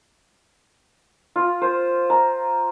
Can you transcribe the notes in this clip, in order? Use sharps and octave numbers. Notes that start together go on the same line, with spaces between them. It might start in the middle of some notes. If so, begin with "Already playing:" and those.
F4
C5
A#5